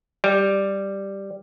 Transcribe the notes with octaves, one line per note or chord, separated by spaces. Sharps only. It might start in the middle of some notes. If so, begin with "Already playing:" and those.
G3